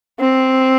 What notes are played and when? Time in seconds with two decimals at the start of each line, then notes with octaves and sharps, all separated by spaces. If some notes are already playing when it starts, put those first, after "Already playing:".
0.20 C4